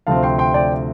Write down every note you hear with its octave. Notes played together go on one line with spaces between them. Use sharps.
D2 C3 F3 C4 F5 A5
G5 C6
G5 C6
D5 G5